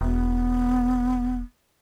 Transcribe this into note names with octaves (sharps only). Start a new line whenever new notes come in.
E1 B3